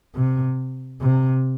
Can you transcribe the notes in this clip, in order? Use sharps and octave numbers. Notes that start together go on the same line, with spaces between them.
C3
C3